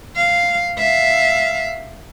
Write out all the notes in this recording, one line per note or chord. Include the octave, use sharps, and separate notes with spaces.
F5
E5 F5